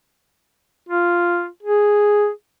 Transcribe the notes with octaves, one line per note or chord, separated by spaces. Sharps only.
F4
G#4